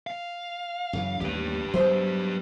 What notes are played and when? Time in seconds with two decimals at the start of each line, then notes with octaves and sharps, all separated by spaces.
0.07 F5
0.93 F#2 C#3 E3
1.21 A1 D#2 G3 G4 B4
1.74 F#3 G3 B3 C5 E5